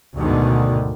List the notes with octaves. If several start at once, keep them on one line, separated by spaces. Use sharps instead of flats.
D2 G#2 B2 D3 D#3